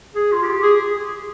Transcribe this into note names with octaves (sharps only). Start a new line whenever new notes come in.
G#4
F4
G4
G#4